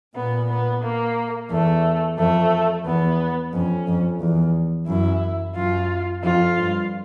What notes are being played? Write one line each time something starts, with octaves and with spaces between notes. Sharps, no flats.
A#2 B3
B3
A#3
E2 A3
F2 A3
E2 B3
F2 C#4
F2
E2
F#2 E4
F#2 F4
F2 F4
G2